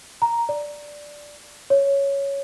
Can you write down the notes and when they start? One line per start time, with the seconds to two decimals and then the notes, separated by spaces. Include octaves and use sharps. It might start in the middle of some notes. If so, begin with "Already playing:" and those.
0.22 A#5
0.49 D5
1.70 C#5